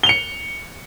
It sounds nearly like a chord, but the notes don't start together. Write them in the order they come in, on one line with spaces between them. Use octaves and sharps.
G7 F7 C#7